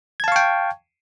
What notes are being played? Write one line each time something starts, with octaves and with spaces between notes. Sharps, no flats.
F5 G5 A5 C#6 G#6